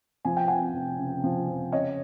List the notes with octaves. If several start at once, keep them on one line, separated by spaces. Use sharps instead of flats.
F3 G#5
G5
F2 F#5 G#5
F1
C#3
F3
F2
C#3 C#5 D#5